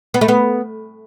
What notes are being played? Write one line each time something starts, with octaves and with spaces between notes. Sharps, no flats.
B3
A3
B3